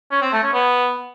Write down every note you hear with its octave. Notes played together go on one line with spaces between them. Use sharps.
C#4
C4
A3
C#4
B3